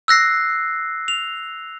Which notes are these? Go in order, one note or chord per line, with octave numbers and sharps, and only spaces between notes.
E6 F#6 A#6 C7
F7